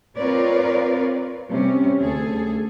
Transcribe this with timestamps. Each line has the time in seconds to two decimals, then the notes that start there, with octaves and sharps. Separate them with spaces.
0.17 C4 F4 A#4 B4 C#5 D5
1.50 C3 G3 C#4
2.01 D2 G#4 A4